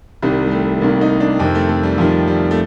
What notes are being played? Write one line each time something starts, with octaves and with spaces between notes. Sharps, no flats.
C2 C3 D#3 G3
G3
A3
C2 C3 D#3 A#3
D#4
D4
F2 C3 D#3 C4
A3
A3
G3
F2 C3 D#3 F3
G3
A3